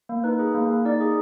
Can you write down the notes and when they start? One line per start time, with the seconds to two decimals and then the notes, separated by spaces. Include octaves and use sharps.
0.09 A#3
0.24 D#4 B4
0.39 G#4
0.55 A#3
0.71 A#3
0.85 D#4 D5
1.01 G#4